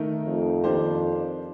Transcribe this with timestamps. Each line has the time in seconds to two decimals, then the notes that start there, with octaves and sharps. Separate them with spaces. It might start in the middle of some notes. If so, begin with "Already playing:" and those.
Already playing: D#3 A3 D#4 A#4
0.26 F2
0.64 D#3 A#3 D4 G4 C5